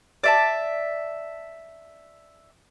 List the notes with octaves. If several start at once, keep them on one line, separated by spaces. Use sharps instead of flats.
D5 E5 A5